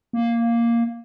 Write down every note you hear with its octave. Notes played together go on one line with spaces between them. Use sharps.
A#3